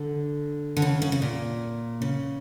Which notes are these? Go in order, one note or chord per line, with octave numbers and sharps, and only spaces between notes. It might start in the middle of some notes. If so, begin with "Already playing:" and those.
Already playing: D3
D3
C#3
C#3
C#3
A#2
C#3